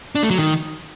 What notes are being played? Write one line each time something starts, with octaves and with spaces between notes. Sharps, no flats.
D4
A3
F#3
D#3